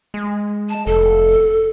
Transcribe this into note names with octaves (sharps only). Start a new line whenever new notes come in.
G#3
A5
F1 A4